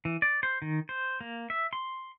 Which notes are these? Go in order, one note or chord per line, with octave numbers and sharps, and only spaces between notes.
E3
D5
C5
D#3
C5
A#3
E5
C6